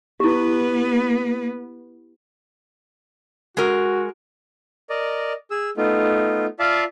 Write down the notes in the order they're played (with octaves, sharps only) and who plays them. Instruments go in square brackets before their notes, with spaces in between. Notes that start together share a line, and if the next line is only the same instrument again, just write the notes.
[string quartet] B3 B4 [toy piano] E4 G4
[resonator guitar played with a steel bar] G#3 A#4 [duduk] F#4
[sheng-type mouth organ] A#4 D5 D#5
G#4 E6
A3 B3 D#4 F4
F4 D5 E5 F5 A5